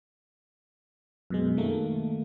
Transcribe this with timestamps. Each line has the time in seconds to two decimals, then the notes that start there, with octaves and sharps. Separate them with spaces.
1.30 F#2 B2 G#3
1.57 D#3 A3 A#3